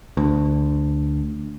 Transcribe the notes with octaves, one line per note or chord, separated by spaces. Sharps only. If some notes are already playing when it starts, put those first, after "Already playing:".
D2